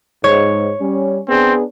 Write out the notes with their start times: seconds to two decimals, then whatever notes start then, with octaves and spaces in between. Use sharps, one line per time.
0.24 G#2 C#5
0.80 G3 C#4
1.28 B3 C4 D4 G#4